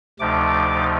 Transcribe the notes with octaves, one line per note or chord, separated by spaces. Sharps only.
D2 C3 F3 A3 D#4 D6